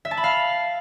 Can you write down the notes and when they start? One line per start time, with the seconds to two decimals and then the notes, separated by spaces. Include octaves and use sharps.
0.05 E5
0.11 A5
0.17 B5
0.24 F5